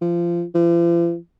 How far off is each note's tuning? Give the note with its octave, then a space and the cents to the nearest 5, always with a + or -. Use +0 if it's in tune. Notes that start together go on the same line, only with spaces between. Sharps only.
F3 -25
F3 -45